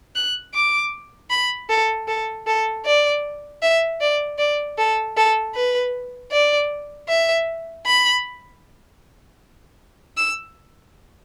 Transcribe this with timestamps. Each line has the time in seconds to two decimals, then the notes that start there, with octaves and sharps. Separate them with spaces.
0.16 F#6
0.54 D6
1.30 B5
1.70 A4
2.08 A4
2.47 A4
2.85 D5
3.62 E5
4.01 D5
4.39 D5
4.78 A4
5.17 A4
5.55 B4
6.32 D5
7.08 E5
7.87 B5
10.17 E6